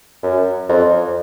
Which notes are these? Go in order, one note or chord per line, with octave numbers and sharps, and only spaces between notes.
F#2
F2